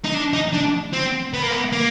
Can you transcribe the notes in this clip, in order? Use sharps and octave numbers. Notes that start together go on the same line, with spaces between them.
D#4
D4
D#4
D4
C4
B3
A#3
B3
A#3